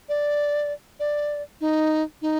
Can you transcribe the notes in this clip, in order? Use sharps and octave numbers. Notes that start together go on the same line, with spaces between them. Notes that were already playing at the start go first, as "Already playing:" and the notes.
D5
D5
D#4
D#4